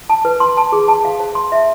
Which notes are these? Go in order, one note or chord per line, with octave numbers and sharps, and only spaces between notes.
A5
B4
C6
A5
G#4
A5
F5
C5
C6
E5